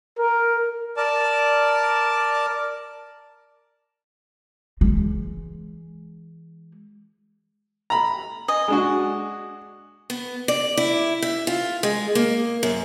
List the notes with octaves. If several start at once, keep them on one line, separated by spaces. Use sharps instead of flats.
A#4
A#4 D5 A5
E3 G#3
A#5 B5
D#5 G#5
G#3 D4 F#4
B3
D5
E4
E5
F4
G#3
A#3
F#2